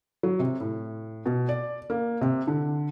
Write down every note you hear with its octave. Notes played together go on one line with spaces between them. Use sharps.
F#3
C3
A2
B2
D5
A#3
C3
D3